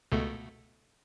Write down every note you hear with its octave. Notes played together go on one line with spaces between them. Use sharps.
C#2 B2 A3